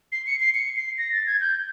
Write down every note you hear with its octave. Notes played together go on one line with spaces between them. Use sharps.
C7
C#7
C7
C#7
C7
A#6
A6
G#6
G6